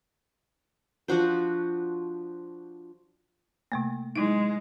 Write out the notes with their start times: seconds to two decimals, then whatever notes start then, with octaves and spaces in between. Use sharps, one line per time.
1.08 F3 D4 F#4 C5
3.72 C3 A3 A#3
4.16 G#3 D#4 E4